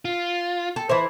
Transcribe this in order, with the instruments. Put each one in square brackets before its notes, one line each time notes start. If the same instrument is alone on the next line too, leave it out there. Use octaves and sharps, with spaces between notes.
[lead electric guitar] F4
[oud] A4
E3 E4 C5